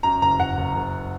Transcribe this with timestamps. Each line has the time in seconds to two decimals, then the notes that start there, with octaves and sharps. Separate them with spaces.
0.03 F#2 A#5
0.21 F#1 A#5
0.39 F#1 F#5
0.57 F#1
0.76 F#1